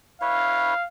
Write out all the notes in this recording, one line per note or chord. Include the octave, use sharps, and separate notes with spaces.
E4 B4 C#5 F5